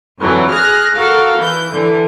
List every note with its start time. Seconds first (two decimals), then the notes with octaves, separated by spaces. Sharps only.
0.20 F2 D3 E3 F#3
0.49 G#4 F6 F#6 A#6
0.95 F#4 A4 A#4 F5
1.37 E3 G6
1.71 D3 E3